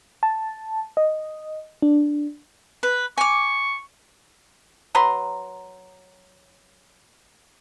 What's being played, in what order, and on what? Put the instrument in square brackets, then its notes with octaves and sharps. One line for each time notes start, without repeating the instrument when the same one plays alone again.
[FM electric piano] A5
D#5
D4
[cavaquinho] B4
[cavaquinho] G#5 D6 [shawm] C#6
[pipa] F#3 B4 A#5 C6